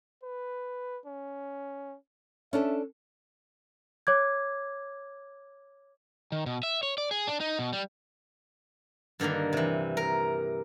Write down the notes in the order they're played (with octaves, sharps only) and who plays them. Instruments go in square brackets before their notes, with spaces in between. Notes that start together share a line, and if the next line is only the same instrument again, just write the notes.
[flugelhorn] B4
C#4
[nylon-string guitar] C#4 D4 A4 [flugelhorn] E5
[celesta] C#5 D6 G#6
[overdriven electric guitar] D#3
B2
E5
C#5
D5
G#4
D4
D#4
B2
G3
[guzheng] G2 D3 D#3 A#3 A#5
C3 E3
A#4